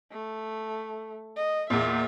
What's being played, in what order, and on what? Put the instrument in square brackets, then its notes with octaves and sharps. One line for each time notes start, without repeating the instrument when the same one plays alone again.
[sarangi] A3
D#5
[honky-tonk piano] E2 A#2 [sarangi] E5